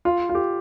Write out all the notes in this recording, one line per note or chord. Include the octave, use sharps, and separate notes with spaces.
F4
F4
G4